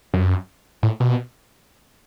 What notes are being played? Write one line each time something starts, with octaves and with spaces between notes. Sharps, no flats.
F#2
A2
B2